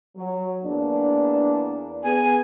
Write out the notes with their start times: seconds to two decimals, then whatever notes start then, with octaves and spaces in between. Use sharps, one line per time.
0.16 F#3
0.64 E2 A#3 D4
2.04 B3 G#4 G#5